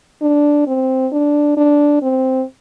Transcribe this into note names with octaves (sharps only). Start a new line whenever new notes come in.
D4
C4
D4
D4
C4